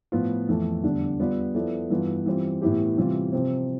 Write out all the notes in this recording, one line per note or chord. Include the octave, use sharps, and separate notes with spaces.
A2 F3 B3 F4
F2 E3 A3 E4
E2 D3 G3 D4
G3 B3 F4 B4 D5
F3 B3 E4 A4 D5
G2 E3 B3 F4
E3 G3 C4 F4
A2 E3 B3 E4 G4
C3 E3 G3 C4 F4
C3 F3 C4